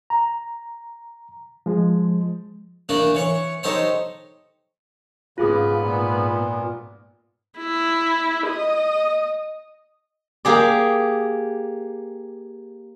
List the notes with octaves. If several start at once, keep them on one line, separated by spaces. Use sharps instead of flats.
A#5
F3 G#3
E3 A3 A#3 D4
E3 C#5 C#6
D#4 G4 A4 C5 C#5
G#2 C#3 B3 F4 G#4 D6
A#2
E4
D#5
A#3 G4 G#4 D5